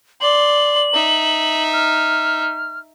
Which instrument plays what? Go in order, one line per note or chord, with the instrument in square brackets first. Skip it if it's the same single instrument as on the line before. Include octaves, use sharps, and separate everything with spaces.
[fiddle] D5 C6 [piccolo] F#7
[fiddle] D#4 E5
[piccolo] F6